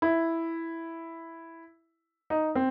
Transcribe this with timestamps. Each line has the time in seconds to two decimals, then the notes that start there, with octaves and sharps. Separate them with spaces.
0.02 E4
2.30 D#4
2.55 C4